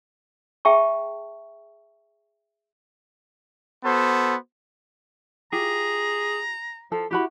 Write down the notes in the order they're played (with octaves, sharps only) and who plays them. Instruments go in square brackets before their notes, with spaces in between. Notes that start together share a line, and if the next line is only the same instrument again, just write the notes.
[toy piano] G#4 E5 G5 A5 C#6
[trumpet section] B3 F#4 A4 C5
[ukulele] F4 G4 [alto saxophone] G#4 [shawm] A#5
[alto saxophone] F3 [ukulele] A4
[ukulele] E4 F#4 B5 [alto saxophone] G4